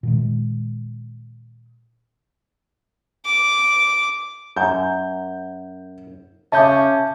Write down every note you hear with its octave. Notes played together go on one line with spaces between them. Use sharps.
A#2 D#3 G#3
D6
F#2 G6
C#3 C#4 E5 A5 D6 G6